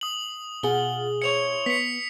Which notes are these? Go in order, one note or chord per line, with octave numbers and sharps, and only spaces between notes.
D#6 F#7
B2 F4 G#4 F#5 G7
E4 C5 C#5 C#7 F7
B3 B6 C#7